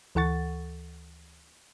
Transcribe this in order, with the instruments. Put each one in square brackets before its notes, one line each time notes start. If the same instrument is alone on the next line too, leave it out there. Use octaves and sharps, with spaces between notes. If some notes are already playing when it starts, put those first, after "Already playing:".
[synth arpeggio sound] D2 E3 A4 F#5 C#6 A6